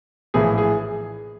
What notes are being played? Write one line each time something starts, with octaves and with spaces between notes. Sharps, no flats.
A#1 A2 E3 G#4
G#4